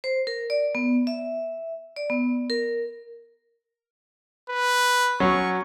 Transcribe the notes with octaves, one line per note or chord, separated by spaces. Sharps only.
C5
A#4
D5
B3
E5
D5
B3
A#4
B4
F#3 C#4 C#6